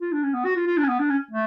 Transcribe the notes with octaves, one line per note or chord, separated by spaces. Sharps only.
F4
D4
C#4
B3
F#4
F4
F4
D4
C#4
B3
D4
C#4
A3